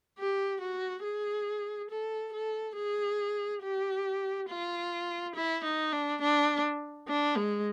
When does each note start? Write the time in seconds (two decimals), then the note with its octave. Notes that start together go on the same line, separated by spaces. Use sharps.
0.18 G4
0.61 F#4
1.04 G#4
1.91 A4
2.33 A4
2.77 G#4
3.63 G4
4.49 F4
5.35 E4
5.64 D#4
5.92 D4
6.21 D4
7.08 D4
7.37 G#3